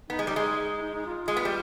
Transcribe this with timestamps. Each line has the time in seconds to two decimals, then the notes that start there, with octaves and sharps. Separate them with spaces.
0.10 B3 D#4
0.19 G#3
0.27 G3 D#4
0.36 G#3
0.82 D#4
0.95 D#4
1.06 F4
1.28 G#3
1.37 B3
1.45 G3